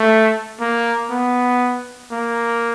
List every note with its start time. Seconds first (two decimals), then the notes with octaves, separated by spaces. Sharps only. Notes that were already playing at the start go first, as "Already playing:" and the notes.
Already playing: A3
0.60 A#3
1.10 B3
2.12 A#3